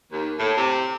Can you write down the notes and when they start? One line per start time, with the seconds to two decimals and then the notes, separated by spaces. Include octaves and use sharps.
0.11 D#2
0.38 A2
0.56 C3